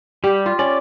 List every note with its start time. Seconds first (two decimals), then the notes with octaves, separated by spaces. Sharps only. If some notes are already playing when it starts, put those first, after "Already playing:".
0.24 G3 G4
0.46 F4
0.59 C#4 D5